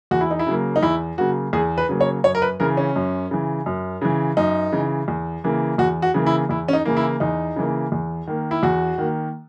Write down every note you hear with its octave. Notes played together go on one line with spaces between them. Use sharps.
E2 F#4
E4
D#4
E4
C#3 F#3 A#3
D#4
E2 E4
C#3 F#3 A#3 F#4
E2 G#4
B4
C#3 F#3 A#3
C#5
F#2 C#5
A#4
B4
C#3 E3 A#4
C#4
F#2
C#3 E3
F#2
C#3 E3
F#2 D#4
C#3 E3
E2
C#3 E3 A#3
E2 F#4
F#4
C#3 E3 A#3
E4
E2 E4
C#4
D#4
C#3 E3 A#3
E4
E2 D#4
C#3 E3 A#3
E2
D#3 A#3
E4
E2 F#4
D#3 A#3